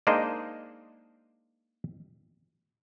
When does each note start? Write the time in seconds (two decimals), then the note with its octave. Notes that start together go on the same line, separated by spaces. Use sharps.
0.07 G#3 A#3 D4 D#4 C5 D#5